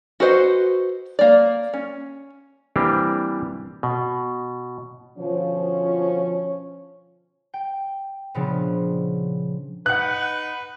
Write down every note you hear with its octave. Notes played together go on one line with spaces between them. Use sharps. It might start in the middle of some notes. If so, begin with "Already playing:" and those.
F#4 A4 B4 C5 D#5
A#3 D5
C#4
E3 G3 A#3 C4 D4 G4
B2
B2 D3 F3 C#4
G5
A#2 C#3 F3 B3 D4
D#4 B4 F#5 F#6